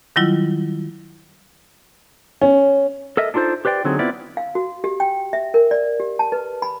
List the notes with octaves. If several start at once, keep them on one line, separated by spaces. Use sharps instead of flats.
D#3 F#3 G3 E4 F4
C#4
A4 A#4 D#5 E5
D4 D#4 F4 A4 C5
G4 B4 C5 D5 G5
D3 F#3 C4 D#4 G#4
B3 C4 E4 F4 B4 D5
F5
F#4
G4
G5
E5
A#4
D5
G4
A5
B4
B5